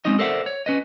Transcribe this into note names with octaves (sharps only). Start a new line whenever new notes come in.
G#3 C4 C#4 D#4 D#5
A4 A#4 C5 D5 E5 F#5
C#5
C#4 B4 D#5